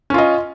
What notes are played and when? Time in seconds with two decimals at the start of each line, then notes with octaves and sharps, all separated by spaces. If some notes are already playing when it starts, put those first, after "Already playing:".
0.10 C#4
0.14 F4
0.18 D#5